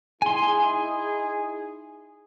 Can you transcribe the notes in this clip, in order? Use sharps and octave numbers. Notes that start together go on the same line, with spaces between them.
D#4 E4 G#4 G#5 C6